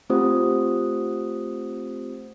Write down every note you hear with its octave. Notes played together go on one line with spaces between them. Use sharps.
A3 C4 F4 G4 C5 D#6